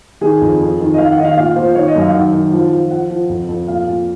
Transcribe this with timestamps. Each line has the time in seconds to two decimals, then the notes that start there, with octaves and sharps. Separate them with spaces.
0.21 D#3 G#4
0.41 F2
0.61 F2
0.80 D#3
0.94 D#5
0.98 D#3 F5
1.12 F#5
1.18 D#3 D#5
1.25 F5
1.37 A#2 F5
1.56 A#2 C5
1.75 D#3 C#5
1.88 D#5
1.95 F#2
2.01 F5
2.13 D#3 F#5
2.33 D#3
2.53 F3
2.71 F3
2.91 F3 F#5
3.10 F3
3.29 F2
3.49 F2
3.67 A#2 F5
3.87 A#2